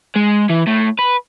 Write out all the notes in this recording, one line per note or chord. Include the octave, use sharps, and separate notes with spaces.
G#3
E3
A2
B4